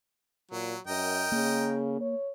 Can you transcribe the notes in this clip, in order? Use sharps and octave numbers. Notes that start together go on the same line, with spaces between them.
A#2 F#3
F#2 A#4 D#5 G5
C#3 A#3
C#5